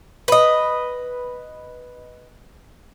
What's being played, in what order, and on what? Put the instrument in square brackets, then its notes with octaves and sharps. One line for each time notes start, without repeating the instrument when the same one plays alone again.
[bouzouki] B4 D#5